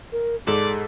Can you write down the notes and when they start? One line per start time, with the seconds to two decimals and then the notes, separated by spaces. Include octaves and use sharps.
0.12 A#4
0.47 G#2 G#4 A4 D5